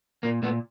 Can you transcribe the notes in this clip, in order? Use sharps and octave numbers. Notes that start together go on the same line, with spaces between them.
A#2 A#3
A#2 A3 B3